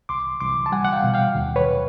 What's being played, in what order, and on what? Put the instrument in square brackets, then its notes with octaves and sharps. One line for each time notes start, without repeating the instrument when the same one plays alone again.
[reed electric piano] C2 C6 D6
C2 C6 D6
A5
G3 F#5 G#5
F#5
F5 G5
B2
F5 G5
D#2
B4 C#5